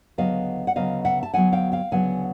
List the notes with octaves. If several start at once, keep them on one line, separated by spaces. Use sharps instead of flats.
D2 C#3 F#3 B3 D#5 F5
F#5
D2 C#3 F#3 B3 D#5 F5
E5 F#5
A5
D2 C#3 F#3 B3 F#5 G#5
F5 G5
F5 G5
D2 C#3 F#3 B3 F#5 G#5